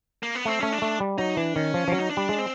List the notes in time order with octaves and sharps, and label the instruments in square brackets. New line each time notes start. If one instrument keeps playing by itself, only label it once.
[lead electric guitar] A#3
B3
[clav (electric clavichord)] A3 [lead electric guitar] C4
[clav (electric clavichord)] A3 [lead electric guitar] C#4
[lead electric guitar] D4
[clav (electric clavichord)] A3
G3
[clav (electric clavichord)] F#3 [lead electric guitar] D#4
[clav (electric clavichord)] E3 [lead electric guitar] D4
[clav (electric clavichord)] D#3 [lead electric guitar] C#4
[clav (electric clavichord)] F3
F3
F#3
[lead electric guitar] D#4
D4
[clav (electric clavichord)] G3
G#3
[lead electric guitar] C4